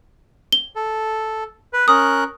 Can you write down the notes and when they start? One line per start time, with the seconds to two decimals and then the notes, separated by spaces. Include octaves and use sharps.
0.52 G7
0.76 A4
1.73 B4
1.88 C#4 A#4 D#6 F#6